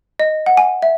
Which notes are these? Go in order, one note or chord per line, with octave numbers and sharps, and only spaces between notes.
D#5
F#5
G#5
E5